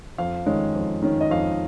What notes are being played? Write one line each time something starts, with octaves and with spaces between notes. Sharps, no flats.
F2 F5
D#3 G#3 C#4
F2
D#3 G#3 C#4
D#5
F2 F5